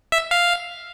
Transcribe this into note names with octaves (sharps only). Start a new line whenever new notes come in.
E5
F5